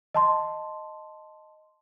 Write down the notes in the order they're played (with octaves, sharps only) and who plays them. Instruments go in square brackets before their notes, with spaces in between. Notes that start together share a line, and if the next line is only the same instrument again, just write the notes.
[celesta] D#5 A5 C6